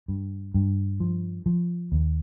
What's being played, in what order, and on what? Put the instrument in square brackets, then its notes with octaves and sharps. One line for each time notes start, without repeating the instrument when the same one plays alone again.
[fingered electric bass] G2
G2
F3
F3
D#2